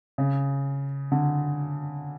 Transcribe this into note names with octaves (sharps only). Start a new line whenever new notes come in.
C#3
D3